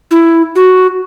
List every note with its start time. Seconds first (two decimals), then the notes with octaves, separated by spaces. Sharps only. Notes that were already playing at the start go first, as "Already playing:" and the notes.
0.11 E4
0.55 F#4